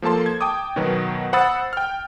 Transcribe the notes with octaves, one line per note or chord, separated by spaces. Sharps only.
F3 A#3 A4 A5 C6
G#6
G5 A5 D6 D#6
B2 D#3 F#3 B3
C5 F#5 B5 D#6 E6 A6
G5 F6